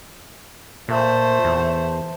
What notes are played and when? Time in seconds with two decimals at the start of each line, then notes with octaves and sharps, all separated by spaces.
0.89 A#2 A3 C5
1.44 E2